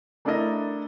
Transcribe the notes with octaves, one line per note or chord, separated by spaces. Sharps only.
A3 D4 E4 A4 A#4 D#5